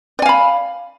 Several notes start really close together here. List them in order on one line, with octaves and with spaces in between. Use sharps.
D5 G#5 F5 B5